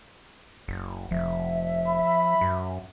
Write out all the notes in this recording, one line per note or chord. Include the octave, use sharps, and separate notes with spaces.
F#1
F1 F3 E5
B5
F#2